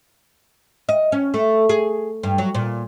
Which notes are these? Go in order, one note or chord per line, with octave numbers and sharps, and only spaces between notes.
D#5
C#4
A3
G#4
G2
F#3
A#2